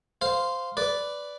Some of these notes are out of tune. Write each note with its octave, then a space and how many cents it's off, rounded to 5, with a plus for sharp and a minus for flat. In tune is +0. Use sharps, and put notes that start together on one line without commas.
C5 -10 F5 +0
B4 +5 D5 -10